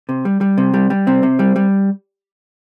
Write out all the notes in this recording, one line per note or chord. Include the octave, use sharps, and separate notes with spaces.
C3
G3
G3
C3
G3
G3
C3 C4
C3
G3
G3